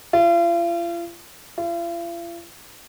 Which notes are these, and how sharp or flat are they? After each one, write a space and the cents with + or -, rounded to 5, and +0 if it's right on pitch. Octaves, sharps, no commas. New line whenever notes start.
F4 -40
F4 -45